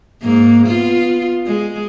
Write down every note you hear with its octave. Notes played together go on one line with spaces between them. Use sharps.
G#2 A#3
B3 F4
G#3